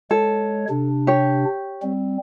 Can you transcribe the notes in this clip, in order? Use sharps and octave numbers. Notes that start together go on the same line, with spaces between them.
G#3 A4 C#5
C3 D4
G4 C#5
G3 C4